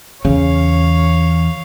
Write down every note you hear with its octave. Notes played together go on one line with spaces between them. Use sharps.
E2 C#3 C#5 F5